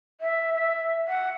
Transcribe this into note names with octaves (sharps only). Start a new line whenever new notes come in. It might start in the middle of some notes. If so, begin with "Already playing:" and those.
E5
E5
F#5